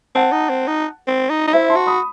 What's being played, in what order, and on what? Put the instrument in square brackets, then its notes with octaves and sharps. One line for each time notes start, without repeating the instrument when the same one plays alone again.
[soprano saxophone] C4 [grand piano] F#5 A5
[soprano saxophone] D#4
C4
D#4
C4
D#4
D#4
[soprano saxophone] E4 [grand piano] C5 E5
[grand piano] A5 C6
[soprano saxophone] F#4
[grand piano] B5 D#6